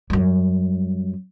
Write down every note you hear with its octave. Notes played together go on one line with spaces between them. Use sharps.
F#2 G3